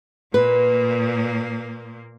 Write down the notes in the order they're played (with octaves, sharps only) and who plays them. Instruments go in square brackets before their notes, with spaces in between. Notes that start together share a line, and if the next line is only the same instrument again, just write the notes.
[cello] A#2 A#3 [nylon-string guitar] B4